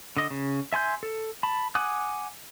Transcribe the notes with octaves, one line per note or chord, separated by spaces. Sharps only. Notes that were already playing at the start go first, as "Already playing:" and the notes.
D3 D#5
C#3
E5 G#5 C6 G6
A4
A5 B5
F#5 G#5 D6 D#6 F#6